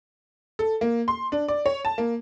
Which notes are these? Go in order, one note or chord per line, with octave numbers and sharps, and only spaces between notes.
A4
A#3
C6
D4
D5
C#5
A5
A#3